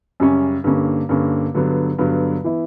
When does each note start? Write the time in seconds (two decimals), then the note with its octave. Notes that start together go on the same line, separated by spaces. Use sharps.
0.20 F#2 C#3 G3 C#4
0.64 G2 D3 A#3 C#4
1.09 G2 D3 A#3 C#4
1.54 G2 D3 F#3 B3
1.98 G2 D3 F#3 B3
2.44 E3 B3 E4